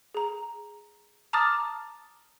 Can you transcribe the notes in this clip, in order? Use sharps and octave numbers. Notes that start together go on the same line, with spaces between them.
G#4 A#5
A5 A#5 D6 D#6 F6 A6